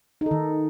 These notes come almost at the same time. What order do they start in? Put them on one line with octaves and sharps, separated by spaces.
D#4 A4 D#3